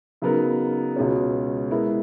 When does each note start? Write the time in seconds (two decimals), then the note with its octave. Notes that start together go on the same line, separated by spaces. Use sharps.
0.22 C#3 F#3 B3 D#4 A#4
0.96 C#2 B2 G#3 C#4
1.71 G#3 B3 E4 A#4